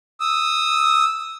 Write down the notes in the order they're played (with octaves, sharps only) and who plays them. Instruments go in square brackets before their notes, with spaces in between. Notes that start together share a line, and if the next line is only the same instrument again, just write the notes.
[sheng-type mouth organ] D#6 E6